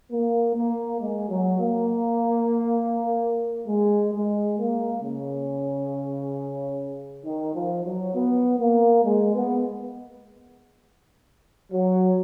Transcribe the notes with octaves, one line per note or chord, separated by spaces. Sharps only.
A#3
A#3
G#3
F#3
A#3
G#3
G#3
A#3
C#3
D#3
F3
F#3
B3
A#3
G#3
B3
F#3